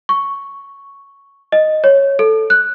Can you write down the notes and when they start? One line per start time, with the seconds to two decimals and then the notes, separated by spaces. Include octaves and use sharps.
0.09 C#6
1.52 D#5
1.84 C#5
2.19 A4
2.50 F#6